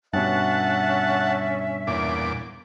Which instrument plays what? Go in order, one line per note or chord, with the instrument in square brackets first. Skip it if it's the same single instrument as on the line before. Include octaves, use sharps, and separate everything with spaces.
[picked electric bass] G2 B2 [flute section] C#4 E5 [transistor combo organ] F#5 A5
[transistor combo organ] E2 A#2 D6